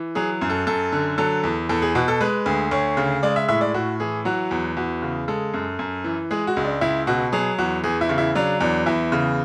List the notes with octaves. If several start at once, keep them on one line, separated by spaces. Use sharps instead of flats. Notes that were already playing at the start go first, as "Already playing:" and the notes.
Already playing: E3
F#3 G#4
F#2
A4
F#2 A4
D3
F#3 A4
E2
E2 A4
G#4
B2 F#4
A4
G#3 B4
D2
D2 C#5
C#3
G#3 D5
E5
A2 E5
D5
A2 F#4
E3 G#4
F#3 F#4
E2
E2 F#4
C#3
G#3 A4
F#2
F#2
E3
G#3 G#4
F#4
C#2
D4
C#2 E4
B2 F#4
F#3 G#4
E2 F#4
E2 G#4
E4
C#3
E4
F#3 D4
E2 D4
E2 E4
C#3